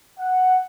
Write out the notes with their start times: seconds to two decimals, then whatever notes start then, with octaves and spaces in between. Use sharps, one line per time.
0.19 F#5